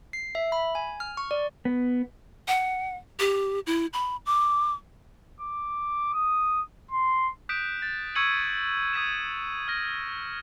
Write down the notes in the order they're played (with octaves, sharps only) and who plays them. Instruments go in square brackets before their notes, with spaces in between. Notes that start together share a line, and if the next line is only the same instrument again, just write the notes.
[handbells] C7
E5
B5
G#5
F6
C#6
D5
[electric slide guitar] B3
[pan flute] F#5
G4
E4
B5
D6
[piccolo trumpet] D6
D#6
C6
[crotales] D#6 F#6 G6 B6 D7 E7
A6
C#6 E6 G#6 C#7 D#7 F#7
D#6 G#6 B6 D#7 E7
F6 A#6